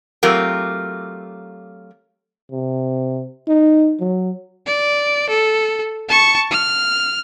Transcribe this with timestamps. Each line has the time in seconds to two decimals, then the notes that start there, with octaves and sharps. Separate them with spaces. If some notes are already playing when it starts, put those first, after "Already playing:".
0.23 F#3 A3 C4 F4 G4 A#4
2.52 C3
3.48 D#4
4.00 F#3
4.67 D5
5.30 A4
6.09 A5 C#6
6.51 F6